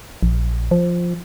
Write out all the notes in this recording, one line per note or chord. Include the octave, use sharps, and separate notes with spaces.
A#1
F3